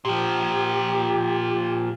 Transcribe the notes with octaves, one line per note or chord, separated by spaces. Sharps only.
A#2 F3 G4